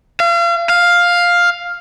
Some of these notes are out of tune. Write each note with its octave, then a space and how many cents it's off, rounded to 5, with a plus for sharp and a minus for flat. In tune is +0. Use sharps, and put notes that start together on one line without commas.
F5 -35
F5 +5